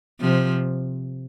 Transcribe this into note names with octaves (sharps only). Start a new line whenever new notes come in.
C3 F3